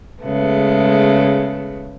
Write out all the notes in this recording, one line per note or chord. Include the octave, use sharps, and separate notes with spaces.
C#3 G#3 A3 B3